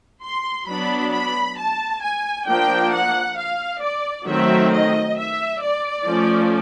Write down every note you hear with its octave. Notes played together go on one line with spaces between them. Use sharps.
C6
F#3 B3 D4 B5
B5
A5
G#5
F3 A#3 D4 G5
F#5
F5
D5
D#3 F#3 A3 C4 E5
D#5
E5
D5
F3 A3 C#4